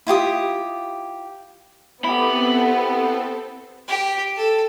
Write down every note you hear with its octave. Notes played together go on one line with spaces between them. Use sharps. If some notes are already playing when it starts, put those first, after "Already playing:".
E4 F4 G4 D#6
B3 C4 E4 G4 A4 B5
G4
A4